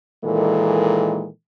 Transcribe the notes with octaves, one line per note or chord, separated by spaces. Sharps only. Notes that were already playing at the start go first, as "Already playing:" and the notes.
A#2 D#3 E3 G#3 A4